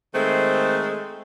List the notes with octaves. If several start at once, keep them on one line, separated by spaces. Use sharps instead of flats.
D#3 G#3 A3 C4